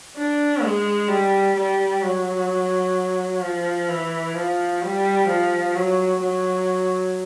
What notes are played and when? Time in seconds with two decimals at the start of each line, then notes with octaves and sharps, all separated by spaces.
0.17 D4
0.63 G#3
1.09 G3
1.56 G3
2.03 F#3
3.42 F3
3.89 E3
4.35 F3
4.82 G3
5.28 F3
5.75 F#3
6.21 F#3